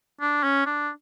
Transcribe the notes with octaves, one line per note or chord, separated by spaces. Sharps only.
D4
C#4
D4